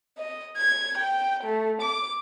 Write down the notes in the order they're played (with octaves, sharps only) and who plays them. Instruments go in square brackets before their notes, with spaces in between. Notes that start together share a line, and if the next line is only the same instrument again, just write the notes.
[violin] D#5
G#6
G5
A3
D6